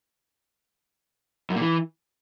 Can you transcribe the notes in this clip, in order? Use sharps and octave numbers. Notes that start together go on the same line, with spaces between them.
F#2
A#2
E3